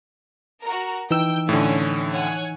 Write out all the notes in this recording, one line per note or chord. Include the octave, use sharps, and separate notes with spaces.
F#4 A#4 A#5
E3 D#4 G5 E6
A2 D3 C#4
C#5 F#5 G#5